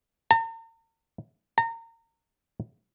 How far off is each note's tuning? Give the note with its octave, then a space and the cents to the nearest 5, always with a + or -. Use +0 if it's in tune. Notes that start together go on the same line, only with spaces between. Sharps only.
A#5 -45
A#5 -30